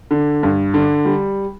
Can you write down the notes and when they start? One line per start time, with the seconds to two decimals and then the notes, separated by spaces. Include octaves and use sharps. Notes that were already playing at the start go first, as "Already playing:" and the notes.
0.11 D3
0.43 G2
0.74 D3
1.05 G3